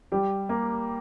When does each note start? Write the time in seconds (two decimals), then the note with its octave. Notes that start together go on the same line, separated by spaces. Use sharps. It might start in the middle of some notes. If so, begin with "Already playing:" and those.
0.12 G3 G4
0.49 A#3